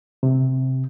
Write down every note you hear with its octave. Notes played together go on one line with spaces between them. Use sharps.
C3